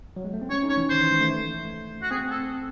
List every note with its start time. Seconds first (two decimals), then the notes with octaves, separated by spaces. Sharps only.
0.16 F#3
0.24 G#3
0.34 A3
0.42 C4
0.50 C#4 C#5
0.63 D#4
0.70 C#5
0.77 E3
0.90 D#3 C5
1.01 E3
1.11 G#3
1.21 A3
1.31 A3
2.02 F#4
2.11 C4 G#4
2.31 A4